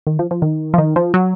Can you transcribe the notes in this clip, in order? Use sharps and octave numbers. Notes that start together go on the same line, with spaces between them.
D#3
F3
F3
D#3
F3
D#3
F3
F#3